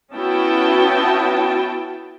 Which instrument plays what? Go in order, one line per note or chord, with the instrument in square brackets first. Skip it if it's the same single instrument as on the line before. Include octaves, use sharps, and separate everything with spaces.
[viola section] B3 C#4 E4 F#4 G5 A5